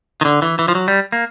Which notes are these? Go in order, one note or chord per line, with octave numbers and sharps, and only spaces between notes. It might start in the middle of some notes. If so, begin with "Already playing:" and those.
D#3
D3
E3
E3
F3
F#3
G3
A#3